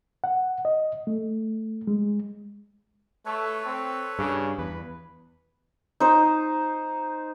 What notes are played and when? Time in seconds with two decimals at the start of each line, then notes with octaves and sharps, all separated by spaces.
0.24 F#5
0.65 D#5
1.07 A3
1.87 G#3
3.26 A3 A4 B4 C#5
3.66 C4
4.19 G2 C#3
4.58 E2 B4
6.00 D#4 C5